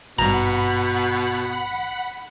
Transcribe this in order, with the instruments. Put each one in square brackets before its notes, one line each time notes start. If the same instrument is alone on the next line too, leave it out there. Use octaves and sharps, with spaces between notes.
[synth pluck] G#1 G2 [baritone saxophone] B2 [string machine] F#5 B5 [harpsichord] A#5